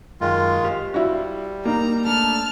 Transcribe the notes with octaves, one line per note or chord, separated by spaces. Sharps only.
F#2 D#3 G#3 F4
G4 C5 F5
G3 E4 F#4
A#3 D#4 A#5
A3 D4 A5 F6